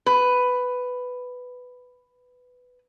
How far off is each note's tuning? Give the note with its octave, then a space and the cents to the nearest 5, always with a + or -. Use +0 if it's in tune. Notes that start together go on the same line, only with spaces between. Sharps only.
B4 +10